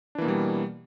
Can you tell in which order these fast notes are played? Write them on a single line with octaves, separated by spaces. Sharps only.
D4 E3 A#3 B2 G3